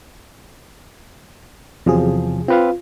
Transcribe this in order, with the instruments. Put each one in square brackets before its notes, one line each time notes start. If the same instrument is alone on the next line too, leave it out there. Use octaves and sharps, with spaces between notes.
[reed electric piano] E2 F3 [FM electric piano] C3 F#3 G#4
[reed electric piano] C4 B4 F5 [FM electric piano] F4